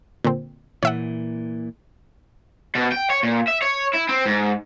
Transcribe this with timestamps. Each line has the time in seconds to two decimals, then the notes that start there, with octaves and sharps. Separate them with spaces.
0.24 A#2 D3 C4
0.83 A#2 E3 C#5 E5 F#5
2.75 B2
2.92 G5
3.10 C#5
3.23 A#2
3.48 E5
3.62 C#5
3.93 E4
4.09 C4
4.26 G#2